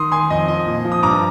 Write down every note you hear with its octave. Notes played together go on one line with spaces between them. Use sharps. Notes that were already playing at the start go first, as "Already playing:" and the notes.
Already playing: D#3 C6 D#6
D#3 G#5 C6
F2 D#5
F3 D#5
A#2
F3
D#6
G2 A#5 D6